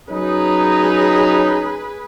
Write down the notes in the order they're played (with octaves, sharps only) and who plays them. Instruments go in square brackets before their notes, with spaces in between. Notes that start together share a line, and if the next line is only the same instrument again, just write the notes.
[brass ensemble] F#3 C#4 D#4 [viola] G#4 B4